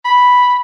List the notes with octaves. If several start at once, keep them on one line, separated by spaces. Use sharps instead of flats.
B5